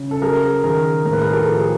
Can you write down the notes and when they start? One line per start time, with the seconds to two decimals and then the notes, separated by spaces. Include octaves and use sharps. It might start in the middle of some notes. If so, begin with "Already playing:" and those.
Already playing: C#3
0.11 A4
0.22 F#3 G#4 A#4
0.63 D#3 G#4 A#4
1.05 A2 A#4
1.13 B4
1.21 G#4 A#4
1.33 G4 A4
1.47 F3
1.60 G#4